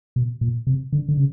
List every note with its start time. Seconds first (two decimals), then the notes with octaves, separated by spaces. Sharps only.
0.16 B2
0.41 A#2
0.67 C3
0.92 D3
1.09 D3
1.17 C#3